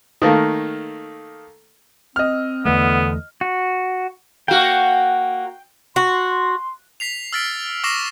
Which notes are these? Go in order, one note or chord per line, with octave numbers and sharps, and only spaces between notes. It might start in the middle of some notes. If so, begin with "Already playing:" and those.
D#3 A3 A#3
C4 D#5 F6
E2 D3 E3 A3 B3
F#4
A#3 F#4 G5
F#4 C6
B6 C7 F7
E6 F6 A6 B6 D7
C#6 D6 E6 A#6 C7 E7